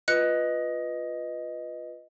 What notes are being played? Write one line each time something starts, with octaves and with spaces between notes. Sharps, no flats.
F4 B4 D#5 F#6 C#7